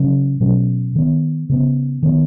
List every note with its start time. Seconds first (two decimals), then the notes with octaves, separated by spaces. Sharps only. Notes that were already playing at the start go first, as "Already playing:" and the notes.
Already playing: C#3 F#3 C#4
0.40 B2 F#3 C#4
0.95 D#3 B3
1.49 C#3 B3
2.03 D#3 B3